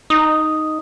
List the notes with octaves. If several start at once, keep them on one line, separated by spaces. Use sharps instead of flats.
D#4 D#6